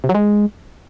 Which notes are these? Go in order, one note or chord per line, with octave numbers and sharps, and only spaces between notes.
C3
F#3
G#3